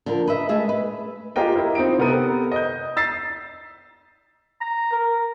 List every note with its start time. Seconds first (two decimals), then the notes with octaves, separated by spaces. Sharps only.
0.06 D3 F3 A#4
0.27 B4 D#5 E5
0.49 G#3 A3 G#4 E5
0.69 B4
1.36 F4 G4 G#4 A#4 D#5 G5
1.56 E4 A#4
1.75 C4 D#4 F4 D7
1.99 C3 B3 A4 A#4 D#7
2.52 D#5 G6
2.97 E6 A6 B6 C7
4.61 A#5
4.92 A#4